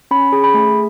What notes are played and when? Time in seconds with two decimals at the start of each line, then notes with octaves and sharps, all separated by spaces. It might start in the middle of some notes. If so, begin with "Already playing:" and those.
0.11 C#4 B5
0.32 G#4
0.44 B5
0.54 A3